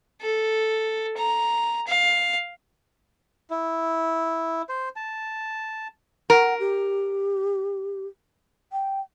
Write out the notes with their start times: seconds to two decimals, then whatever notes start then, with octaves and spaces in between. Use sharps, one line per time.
0.22 A4
1.17 A#5
1.87 F5
3.50 E4
4.69 C5
4.96 A5
6.30 A#4 F#5
6.59 G4
8.72 G5